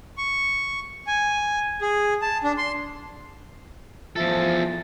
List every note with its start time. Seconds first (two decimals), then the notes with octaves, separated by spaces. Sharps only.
0.17 C#6
1.07 G#5
1.82 G#4
2.22 A5
2.44 D4
2.58 C6
4.16 E2 F3 F4 A4 E5 E6